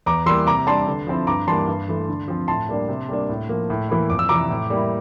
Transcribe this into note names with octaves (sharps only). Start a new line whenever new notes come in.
E2 A#5 D6
E3 G3 A#3 C6 E6
C3 A#5 D6
G3 D4 A5 C6
D3
F3 C4 E4
G2 A#5 D6
E3 G3 A#3 A5 C6
G2
E3 A3
D3
F3 C4
A2 A5 C6
G3 A#3 D4
C3
G3 A#3 D4
A2
F3 A#3
A2
E3 A#3 E4
F2 D6
E6
C3 E3 A#5 D6
A2
G3 A#3 E4